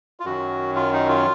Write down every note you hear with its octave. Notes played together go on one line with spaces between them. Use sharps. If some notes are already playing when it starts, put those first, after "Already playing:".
F4
F#2 D#3 F#3 F#4
F4
D#4
F4